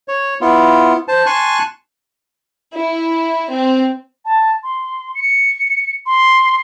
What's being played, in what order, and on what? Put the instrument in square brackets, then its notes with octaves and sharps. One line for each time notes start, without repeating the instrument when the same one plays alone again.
[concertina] C#5
B3 E4 F4
C5 A5
G#5 A5 C6 C#6 F#6
[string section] E4
C4
[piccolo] A5
C6
C#7
C6